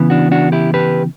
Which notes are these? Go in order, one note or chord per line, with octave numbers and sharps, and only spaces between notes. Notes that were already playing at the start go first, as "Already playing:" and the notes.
Already playing: C#3 E3 B3
D4 F#4
D4 F#4
E4 G4
G4 B4